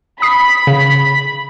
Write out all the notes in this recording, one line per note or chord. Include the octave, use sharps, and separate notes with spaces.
B5 D#6 C7
C#3